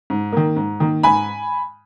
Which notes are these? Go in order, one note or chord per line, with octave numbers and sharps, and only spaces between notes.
G#2
D#3 A#3
G#2
D#3 A#3
G#2 G#5 B5